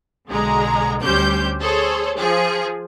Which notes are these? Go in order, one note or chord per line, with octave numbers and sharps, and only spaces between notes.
B1 D3 G#3 G#4 A#5
D2 G3 C#4 G4 C5 G6
G#4 A4 C5 C#5
F3 G#4